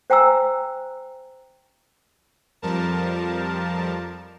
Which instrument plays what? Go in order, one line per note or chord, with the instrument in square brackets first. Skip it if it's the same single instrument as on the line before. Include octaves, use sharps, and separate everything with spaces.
[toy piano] C5 G5 G#5 A#5 E6
[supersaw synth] F2 F3 G3 A#4 A5